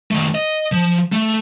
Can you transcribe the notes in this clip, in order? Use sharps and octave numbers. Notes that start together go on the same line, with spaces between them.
D#3 A3
D#5
F3
A3